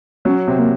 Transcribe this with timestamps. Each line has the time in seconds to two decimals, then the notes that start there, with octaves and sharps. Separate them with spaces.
0.25 F#3 C#4
0.47 C3 C4
0.59 A#3